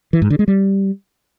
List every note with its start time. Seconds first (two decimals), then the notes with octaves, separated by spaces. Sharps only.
0.13 E3
0.22 G#2
0.30 D3
0.39 G#3
0.48 G3